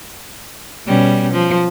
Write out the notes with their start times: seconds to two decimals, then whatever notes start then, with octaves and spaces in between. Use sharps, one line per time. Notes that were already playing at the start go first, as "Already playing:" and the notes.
0.86 B2 G3 C#4
1.32 F3